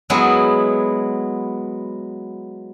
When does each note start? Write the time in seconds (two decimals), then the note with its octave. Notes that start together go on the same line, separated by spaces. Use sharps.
0.10 F#3 G#3 B3 E4